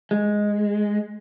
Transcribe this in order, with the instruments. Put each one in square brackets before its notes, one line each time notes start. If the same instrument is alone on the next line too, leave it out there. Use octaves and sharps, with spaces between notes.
[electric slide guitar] G#3